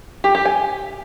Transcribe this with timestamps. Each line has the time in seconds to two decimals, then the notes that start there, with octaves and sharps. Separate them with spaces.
0.24 G4
0.35 G4
0.45 G#5